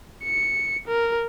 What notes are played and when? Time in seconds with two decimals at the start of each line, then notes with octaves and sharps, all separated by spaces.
0.24 C#7
0.87 A#4